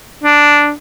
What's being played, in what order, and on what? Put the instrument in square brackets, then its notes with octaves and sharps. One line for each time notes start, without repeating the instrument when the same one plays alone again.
[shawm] D4